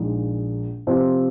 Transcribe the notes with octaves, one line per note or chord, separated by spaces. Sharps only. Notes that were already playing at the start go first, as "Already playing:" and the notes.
Already playing: A#1 A#2 G#3 D#4
C3 F3 C4 F4 C5